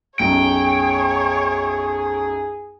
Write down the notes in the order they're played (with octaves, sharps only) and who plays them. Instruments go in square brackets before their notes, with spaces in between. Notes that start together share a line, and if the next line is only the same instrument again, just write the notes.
[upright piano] B1 F#2 [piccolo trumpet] G#4 [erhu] C#5 [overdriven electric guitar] G5